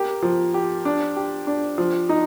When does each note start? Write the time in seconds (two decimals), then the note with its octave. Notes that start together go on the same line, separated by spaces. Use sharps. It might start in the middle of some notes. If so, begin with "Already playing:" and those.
Already playing: A#3 G4
0.22 F3
0.54 G4
0.85 D4
1.17 G4
1.47 D4
1.78 F3
2.09 D#4